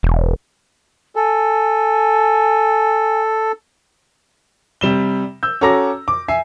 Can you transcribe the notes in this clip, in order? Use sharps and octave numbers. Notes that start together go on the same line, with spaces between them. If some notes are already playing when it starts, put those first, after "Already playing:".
E1
A4 G#5
C3 G3 E7 G7
E6 G6
C#4 F#4 A4 A#5 D6 A#6
D6
E5 G#5 C7